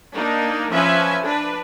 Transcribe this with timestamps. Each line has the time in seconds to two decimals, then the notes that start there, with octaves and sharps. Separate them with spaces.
0.15 A#3 D4 D#4
0.71 F3 C#4 B4 E5 G#5
1.25 D4 B4